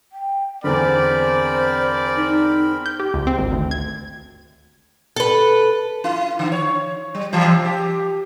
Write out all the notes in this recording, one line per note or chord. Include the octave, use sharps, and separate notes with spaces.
G5
E2 D3 C4 A#4 C5 D5 B5
D#4
G6
G4
C#2
C4
G#1
D2
G#6
A4 B4
E4
D3
C#5
G3
C3 E3 F3
G4